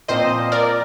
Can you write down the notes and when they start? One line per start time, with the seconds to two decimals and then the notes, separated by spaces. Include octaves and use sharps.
0.08 A#2 F3 C4 C5 D#5
0.52 A#4 D5